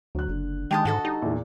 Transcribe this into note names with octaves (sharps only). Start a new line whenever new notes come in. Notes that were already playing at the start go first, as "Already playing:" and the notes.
D2 F#3 F#6
F#1 D3
D#3 G#3 G4 A5 D#6
G#2 F#4 A4 D#5
G3 D#4
E2 A#2 E4